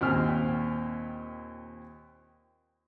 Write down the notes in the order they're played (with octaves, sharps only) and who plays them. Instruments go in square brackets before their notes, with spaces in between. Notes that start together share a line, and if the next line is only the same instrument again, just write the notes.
[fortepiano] D#2 A#2 C4 G#5 F6